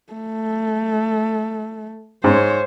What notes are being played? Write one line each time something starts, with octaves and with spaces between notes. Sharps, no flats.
A3
G#2 C5 C#5